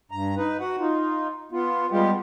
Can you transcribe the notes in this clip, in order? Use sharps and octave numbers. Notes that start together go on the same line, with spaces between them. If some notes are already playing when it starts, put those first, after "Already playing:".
G2 A#5
D#4 B4
F#4 F#5
D#4 F4
B3 F4
G3 G#3 B3 F4 G4